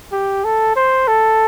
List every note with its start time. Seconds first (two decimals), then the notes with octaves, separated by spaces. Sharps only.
0.12 G4
0.45 A4
0.76 C5
1.08 A4